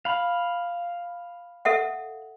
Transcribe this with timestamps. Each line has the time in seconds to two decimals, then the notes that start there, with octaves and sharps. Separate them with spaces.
0.05 F5 B5
1.65 A4 E5 F#5